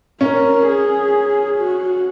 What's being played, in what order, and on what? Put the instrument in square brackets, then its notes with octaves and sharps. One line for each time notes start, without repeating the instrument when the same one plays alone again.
[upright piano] C#4 [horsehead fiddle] A#4
[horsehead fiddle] G#4
F#4